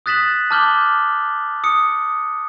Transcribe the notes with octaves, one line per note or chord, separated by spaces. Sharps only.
D#6 F#6 A6 B6 E7 F#7
A5 D6 F6 G6 F#7 G7
D#6 C#7